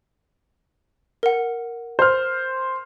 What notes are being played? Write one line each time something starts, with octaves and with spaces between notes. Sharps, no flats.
A#4 F#5
C5 F6